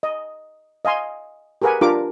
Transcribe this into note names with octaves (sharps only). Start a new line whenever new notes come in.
D#5
D#5 F5 G#5 C6
G4 G#4 A#4 B4 F#5 G#5
D4 F4 G4 A#4 D6